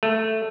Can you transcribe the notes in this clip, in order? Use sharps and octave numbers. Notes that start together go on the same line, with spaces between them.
A3